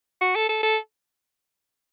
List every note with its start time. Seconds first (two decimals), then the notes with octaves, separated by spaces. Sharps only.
0.22 F#4
0.36 A4
0.49 A4
0.63 A4